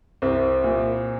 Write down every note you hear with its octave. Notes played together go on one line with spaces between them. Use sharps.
C2 C4
A#2